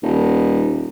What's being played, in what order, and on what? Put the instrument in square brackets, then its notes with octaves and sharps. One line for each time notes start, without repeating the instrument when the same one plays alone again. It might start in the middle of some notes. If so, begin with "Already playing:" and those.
[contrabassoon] D#1